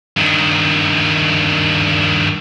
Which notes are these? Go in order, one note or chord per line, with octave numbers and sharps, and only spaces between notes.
G2 D#3